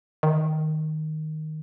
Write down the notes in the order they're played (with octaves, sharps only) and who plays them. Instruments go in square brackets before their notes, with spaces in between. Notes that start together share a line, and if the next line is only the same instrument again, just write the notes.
[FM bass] D#3